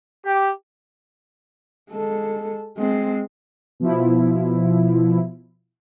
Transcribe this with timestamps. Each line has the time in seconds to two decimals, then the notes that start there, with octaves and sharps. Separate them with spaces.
0.25 G4
1.91 G#3 A4
2.79 G#3 C4
3.80 B2 F3 E4